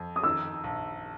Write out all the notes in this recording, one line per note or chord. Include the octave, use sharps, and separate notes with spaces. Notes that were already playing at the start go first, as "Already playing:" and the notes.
Already playing: F2
D#6
D#3 E6
A#1